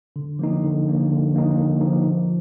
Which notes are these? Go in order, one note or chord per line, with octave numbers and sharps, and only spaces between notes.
D3
F3 A#3 D#4
D3
F3 A#3 D#4
D3
F3 A#3 D#4
D3
F3 A#3 D#4
F3